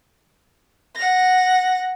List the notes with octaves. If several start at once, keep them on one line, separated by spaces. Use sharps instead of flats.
F#5 A#6